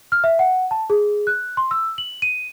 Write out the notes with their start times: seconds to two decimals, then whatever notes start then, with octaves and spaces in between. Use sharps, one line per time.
0.12 F6
0.24 E5
0.39 F#5
0.71 A5
0.90 G#4
1.27 F#6
1.57 C6
1.71 E6
1.98 F#7
2.22 D#7